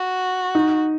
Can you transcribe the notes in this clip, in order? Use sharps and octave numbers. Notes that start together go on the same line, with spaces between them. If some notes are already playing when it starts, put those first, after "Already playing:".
Already playing: F#4
D#4